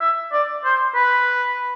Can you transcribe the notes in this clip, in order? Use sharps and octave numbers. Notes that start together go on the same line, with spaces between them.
E5
D5
C5
B4